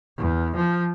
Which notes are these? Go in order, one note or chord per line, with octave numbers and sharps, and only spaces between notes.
E2
F3